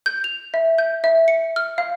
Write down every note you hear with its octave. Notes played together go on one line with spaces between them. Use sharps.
G6
F7
E5
G6
E5
C#7
F6
F5